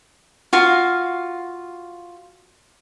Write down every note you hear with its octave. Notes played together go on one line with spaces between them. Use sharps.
F4 F#4 F5